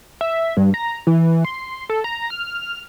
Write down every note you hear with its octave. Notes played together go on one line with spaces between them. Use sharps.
E5
G2
A#5
E3
C6
A4
A#5
F6